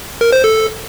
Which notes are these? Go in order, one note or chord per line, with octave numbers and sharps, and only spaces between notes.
A#4
C5
A4